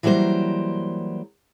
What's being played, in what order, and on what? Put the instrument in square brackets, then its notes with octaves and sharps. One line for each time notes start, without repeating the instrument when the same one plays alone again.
[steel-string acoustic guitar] E3 F#3 G3 A#3 C5